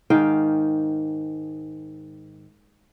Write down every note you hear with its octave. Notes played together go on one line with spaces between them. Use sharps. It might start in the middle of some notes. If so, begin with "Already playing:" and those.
G#2 D#3 F5 G5